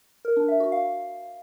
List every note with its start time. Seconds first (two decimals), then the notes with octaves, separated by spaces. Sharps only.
0.25 A#4
0.37 D4
0.48 E5
0.60 F#4
0.72 F5